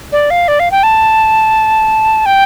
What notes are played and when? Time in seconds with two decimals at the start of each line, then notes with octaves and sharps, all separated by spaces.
0.12 D5
0.30 F5
0.48 D5
0.60 F5
0.71 G5
0.83 A5
2.26 G5